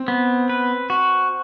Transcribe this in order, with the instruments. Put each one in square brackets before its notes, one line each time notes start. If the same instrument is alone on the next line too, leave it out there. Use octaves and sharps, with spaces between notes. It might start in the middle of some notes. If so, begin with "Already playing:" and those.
Already playing: [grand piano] C4
[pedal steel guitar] B3
B4
F#4